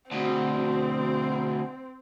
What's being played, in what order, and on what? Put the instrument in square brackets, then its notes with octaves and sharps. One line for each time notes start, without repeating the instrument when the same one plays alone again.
[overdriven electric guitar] D2 B2 [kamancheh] C4